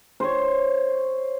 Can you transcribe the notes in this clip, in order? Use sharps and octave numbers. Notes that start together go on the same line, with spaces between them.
C5 C#5